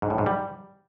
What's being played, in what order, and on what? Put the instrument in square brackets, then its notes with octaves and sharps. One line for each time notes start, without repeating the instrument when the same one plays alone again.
[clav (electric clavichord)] G#2
A2
G#2
G3